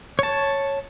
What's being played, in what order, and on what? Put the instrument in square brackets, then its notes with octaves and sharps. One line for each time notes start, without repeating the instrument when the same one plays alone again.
[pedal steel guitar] C#5 A5